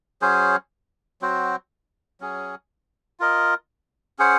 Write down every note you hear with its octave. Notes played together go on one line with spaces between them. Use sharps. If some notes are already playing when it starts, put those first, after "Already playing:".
F#3 C#4 G#4 C5
F#3 C4 F#4 C5
F#3 C#4 G#4
F4 A#4 D#5
C#4 G#4 C5 F#5